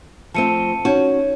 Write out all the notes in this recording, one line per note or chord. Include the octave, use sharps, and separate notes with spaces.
F3 A3 C4 A5 C#7 D#7
C#4 D#4 F#4 C#5